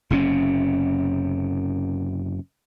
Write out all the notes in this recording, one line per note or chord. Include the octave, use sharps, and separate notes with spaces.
F#1 C3 C4 C#4